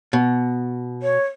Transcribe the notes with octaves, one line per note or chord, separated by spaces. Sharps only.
B2
C#5